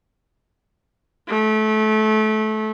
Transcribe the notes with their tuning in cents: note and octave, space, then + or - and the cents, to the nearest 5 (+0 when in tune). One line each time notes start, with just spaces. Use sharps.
A3 -25